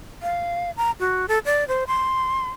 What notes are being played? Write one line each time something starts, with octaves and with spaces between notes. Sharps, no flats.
F5
A#5
F#4
A4
D5
C5
C6